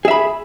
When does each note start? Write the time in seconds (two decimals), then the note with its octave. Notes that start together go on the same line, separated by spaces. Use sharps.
0.05 G#4
0.08 E5
0.11 B5